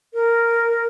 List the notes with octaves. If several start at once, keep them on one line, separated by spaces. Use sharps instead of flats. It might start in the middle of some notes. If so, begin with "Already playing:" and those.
A#4